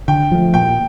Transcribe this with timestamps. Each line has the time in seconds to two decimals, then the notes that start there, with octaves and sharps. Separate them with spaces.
0.08 D3 G5
0.32 F3 A3
0.54 A#2 G5